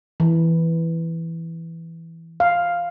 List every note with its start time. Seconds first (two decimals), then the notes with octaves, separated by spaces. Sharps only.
0.20 E3
2.40 F5